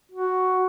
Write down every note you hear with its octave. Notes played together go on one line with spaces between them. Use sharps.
F#4